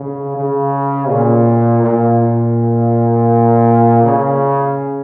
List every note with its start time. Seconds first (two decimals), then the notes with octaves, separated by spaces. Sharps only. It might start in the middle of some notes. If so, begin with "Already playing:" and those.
Already playing: C#3
0.36 C#3
1.09 A#2
1.83 A#2
4.03 C#3